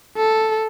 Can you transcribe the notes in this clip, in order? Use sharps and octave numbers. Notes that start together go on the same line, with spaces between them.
A4